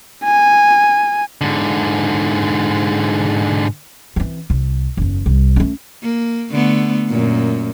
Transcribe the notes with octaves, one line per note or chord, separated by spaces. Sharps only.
G#5
G#2 D3
E3 C4
C2
F#1 E2
C2
A3 C#4
A#3
D3 A3 B3
F#2 A#2